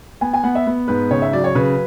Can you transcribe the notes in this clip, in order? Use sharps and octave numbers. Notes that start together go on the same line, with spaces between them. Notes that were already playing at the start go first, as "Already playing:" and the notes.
B3 G#5
G#5
B3 F#5
E5
B3
G#2 B4
C#3 C#5
E5
F#3 D5
C#5
C#3 B4